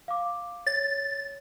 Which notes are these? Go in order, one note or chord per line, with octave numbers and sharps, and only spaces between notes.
F5 D6
C#5 A6